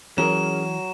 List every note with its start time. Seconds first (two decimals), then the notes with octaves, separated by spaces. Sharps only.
0.18 E3 F#3 C#4 G#4 A#4 E7